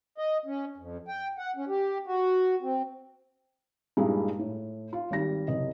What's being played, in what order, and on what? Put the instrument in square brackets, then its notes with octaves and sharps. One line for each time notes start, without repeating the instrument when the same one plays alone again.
[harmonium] D#5
C#4
F2
G5
F#5
C#4
G4
F#4
C4
[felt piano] G2 A#2 G#3 D#4 E4
A2
F4
G#1 G3 A#6
F#1 C3 D#5